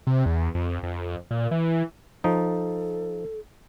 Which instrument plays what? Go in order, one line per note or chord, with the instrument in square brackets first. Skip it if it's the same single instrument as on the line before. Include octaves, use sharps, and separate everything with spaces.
[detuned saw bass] C3
E2
F2
F2
A#2
E3
[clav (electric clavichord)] F3 D#4 [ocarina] A4